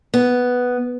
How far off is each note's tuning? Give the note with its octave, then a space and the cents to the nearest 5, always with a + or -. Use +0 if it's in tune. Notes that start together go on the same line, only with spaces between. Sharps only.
B3 +0